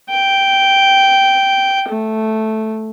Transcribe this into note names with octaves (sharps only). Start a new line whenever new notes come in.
G5
A3